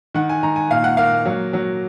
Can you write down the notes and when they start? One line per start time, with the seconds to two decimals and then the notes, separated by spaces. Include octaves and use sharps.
0.14 D#3 F#5
0.29 G#5
0.43 D#3 A#5
0.56 G#5
0.70 A#2 F5
0.84 F#5
0.97 A#3 F5
1.25 F#3
1.53 F#3